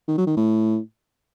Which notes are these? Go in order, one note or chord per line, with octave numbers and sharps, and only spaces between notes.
D#3
F#3
D#3
A2